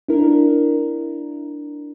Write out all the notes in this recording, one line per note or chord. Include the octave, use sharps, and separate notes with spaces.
D4 E4 A#4